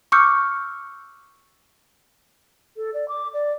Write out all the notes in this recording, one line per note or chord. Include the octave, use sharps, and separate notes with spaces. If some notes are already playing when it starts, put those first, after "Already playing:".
C#6 D6 E6 F6 G6 C#7
A4
D5
D6
D5